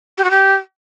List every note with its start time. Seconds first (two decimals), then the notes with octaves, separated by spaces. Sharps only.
0.18 G4
0.24 F#4
0.31 G4